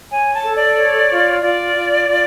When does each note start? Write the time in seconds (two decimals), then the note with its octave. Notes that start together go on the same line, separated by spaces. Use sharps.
0.11 C#5 G#5
0.33 A5
0.43 A4
0.55 D5
0.77 C#5
1.09 F4
1.43 F4 D5
1.76 F4
2.08 F4